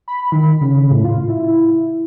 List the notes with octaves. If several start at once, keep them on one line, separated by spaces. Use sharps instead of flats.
B5
D#3
C#3
A2
F4
E4